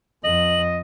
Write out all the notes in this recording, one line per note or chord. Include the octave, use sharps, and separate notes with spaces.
F2 D#5 F#7